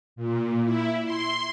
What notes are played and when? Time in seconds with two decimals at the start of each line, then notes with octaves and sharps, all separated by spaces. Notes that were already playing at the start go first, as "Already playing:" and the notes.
0.16 A#2
0.64 E4
1.05 C6